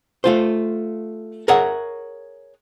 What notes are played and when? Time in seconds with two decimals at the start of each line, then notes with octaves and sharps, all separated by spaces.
0.24 A3 F4 C5
1.48 G#4 A#4 C#5 E5 F#5 A#5